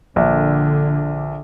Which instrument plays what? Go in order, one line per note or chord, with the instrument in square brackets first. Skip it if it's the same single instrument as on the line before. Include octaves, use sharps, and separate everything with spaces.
[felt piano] A#1 [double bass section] D3